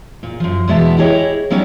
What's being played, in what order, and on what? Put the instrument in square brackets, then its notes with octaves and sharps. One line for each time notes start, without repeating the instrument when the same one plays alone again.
[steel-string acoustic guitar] A#2
F#2 F3
E2 B2 G#3 B3 E5 A5
E4 G4 G#4 C#5 D#5
F#3 G3 B3 C#4 D#4 C#5